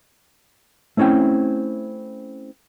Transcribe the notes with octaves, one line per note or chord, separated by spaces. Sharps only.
A3 C4 C#4 E4 G5